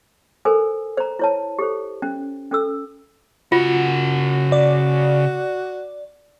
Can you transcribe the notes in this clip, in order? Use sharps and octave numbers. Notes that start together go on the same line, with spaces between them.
A4 A#4 C5 G#5
C5 A#5
E4 C#5 A5
G4 A4 C5
C#4
C#4 A4 E6
C#3 F4 F#4 F#5
D5